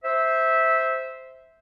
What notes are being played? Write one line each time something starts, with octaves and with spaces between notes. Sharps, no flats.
C5 E5